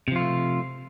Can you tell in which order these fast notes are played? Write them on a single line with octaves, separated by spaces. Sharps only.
C3 F3 F4 A3